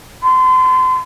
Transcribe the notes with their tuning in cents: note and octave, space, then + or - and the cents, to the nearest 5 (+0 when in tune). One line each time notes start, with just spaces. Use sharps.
C6 -35